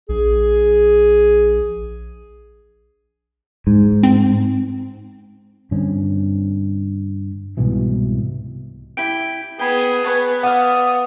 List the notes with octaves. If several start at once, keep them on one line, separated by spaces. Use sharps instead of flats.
A#1 G#4
G#2
C4
G2 D3 C4 C#4
C2 G#2 B2 E3
E4 G4 G5 D7
B3 G#4 G5 B5
B3 B4 C#5 A5
D5 F5 F#5 D#6